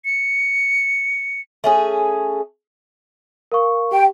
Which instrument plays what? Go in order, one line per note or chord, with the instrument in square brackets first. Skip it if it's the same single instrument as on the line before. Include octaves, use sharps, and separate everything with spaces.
[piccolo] C#7
[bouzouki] A3 C#4 G#4
[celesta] A#4 F5 C#6
[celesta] G4 [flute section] G5